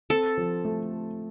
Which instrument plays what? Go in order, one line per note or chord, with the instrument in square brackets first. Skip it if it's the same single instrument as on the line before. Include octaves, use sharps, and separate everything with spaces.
[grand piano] C4 [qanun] A4
[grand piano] F3
A3